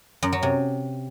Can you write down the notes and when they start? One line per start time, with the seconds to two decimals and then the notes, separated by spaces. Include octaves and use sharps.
0.23 F#2
0.33 F#3
0.43 C3